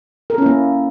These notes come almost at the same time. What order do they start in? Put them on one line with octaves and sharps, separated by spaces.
A#4 A4 C#4 E4 A#3